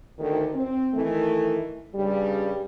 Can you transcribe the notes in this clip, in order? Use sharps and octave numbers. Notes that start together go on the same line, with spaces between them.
D2 D#3
C4
D#3 E3 A3
G2 C#3 G3